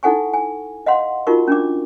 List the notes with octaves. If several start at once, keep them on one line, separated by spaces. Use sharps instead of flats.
D#4 E4 A4 F#5 G#5 C#6
G#5
D#5 F5 F#5 C6
D#4 F4 F#4 A#4 C#6
C#4 D4 D6